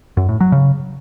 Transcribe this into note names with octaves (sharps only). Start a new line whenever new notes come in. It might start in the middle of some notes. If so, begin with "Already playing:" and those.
F#2
A2
F#3
C#3